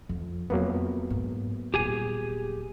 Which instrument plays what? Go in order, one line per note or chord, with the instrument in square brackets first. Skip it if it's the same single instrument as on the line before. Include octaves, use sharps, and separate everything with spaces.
[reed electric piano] F2 [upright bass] F3
[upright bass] F2 [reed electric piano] F#3 A#3 B3
[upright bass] G#2
[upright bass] D#1 [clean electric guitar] G4 G#4 G#5